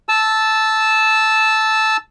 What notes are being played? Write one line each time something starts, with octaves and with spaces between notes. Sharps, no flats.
A5 E6